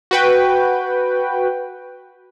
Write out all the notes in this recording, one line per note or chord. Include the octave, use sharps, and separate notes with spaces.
F#4 B4 G5